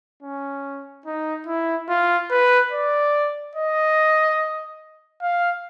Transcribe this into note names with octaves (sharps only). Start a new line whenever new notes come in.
C#4
D#4
E4
F4
B4
D5
D#5
F5